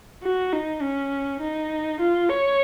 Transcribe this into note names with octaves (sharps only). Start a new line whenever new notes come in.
F#4
D#4
C#4
D#4
F4
C#5